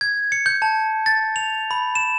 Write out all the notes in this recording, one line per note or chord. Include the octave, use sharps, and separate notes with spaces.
G#6
C#7
G6
A5
A6
F7
B5
E7